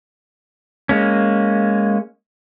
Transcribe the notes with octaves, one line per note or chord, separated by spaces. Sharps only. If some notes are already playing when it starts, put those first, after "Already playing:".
G#3 A#3 C#4